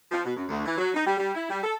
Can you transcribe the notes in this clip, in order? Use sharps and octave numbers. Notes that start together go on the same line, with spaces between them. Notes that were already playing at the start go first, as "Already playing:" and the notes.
F3
B2
F#2
D2
E3
F#3
D#4
G3
G3
E4
G3
A4